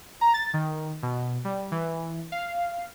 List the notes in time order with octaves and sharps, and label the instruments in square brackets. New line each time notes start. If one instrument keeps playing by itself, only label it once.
[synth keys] A#5
A6
D#3
B2
G3
E3
F5